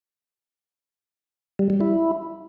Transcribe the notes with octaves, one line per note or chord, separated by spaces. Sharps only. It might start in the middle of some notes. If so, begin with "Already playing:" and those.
G3
G3
E4